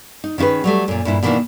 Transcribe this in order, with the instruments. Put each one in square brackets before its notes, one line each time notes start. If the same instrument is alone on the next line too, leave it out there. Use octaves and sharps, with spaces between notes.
[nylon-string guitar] D#4
D#3 C#4 E4 G#4 B4
F#3 G3 A3
F#2 A#2
G2 A#2 E4
B2 D#3 E3 A3 A#3 D4